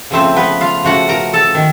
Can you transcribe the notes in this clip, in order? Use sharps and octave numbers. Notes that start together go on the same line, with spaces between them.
C#3 F3 A3 C4 C5
B3 B4
F4 F5
C#3 F3 A3 F#4 F#5
A#4 A#5
A4 A5
D#3